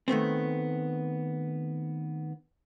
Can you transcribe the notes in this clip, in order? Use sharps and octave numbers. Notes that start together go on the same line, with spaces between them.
D#3 A3 B3 C4